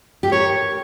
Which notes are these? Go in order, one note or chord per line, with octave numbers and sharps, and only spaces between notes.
G4
A#4 C#5